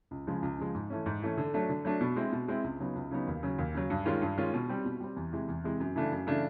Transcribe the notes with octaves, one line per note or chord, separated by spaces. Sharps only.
C#2
C#3 F3 G#3
C#2
C#3 F3 G#3
G#2
E3 A3 C#4
G#2
E3 A3 C#4
D3
F#3 A3 D4
D3
F#3 A3 D4
B2
G#3 C4 E4
B2
G#3 C4 E4
C#2
C#3 F#3 B3 D#4
C#2
C#3 F#3 B3 D#4
D#2
C#3 F#3
D#2
C#3 F#3
G2
D#3 G#3 C#4 F4
G2
D#3 G#3 C#4 F4
B2
G3 C4
B2
G3 C4
E2
C3 E3 G#3
E2
C3 E3 G#3
F#2
C#3 E3 A3 D4
F#2
C#3 E3 A3 D4